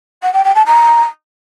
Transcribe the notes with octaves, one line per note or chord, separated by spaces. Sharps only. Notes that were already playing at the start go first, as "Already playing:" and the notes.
F#5
G5
G5
A5
A#5